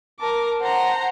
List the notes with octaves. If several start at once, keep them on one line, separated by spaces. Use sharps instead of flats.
A#4 A5 D6
C5 F#5 A#5